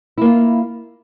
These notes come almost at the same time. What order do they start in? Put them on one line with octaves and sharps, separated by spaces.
E4 A#3 F4